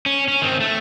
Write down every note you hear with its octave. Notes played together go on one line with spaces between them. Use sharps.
C#4
C#4
D#3 C4
A3